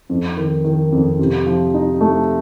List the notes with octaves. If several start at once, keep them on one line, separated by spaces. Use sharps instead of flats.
F2
D#3
D#3
F2
C3
F3
D#4
A3